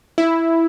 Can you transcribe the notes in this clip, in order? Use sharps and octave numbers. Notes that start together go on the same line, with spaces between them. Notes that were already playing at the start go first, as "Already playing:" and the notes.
E4